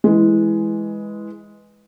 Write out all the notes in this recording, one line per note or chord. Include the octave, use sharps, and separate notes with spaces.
E3 G#3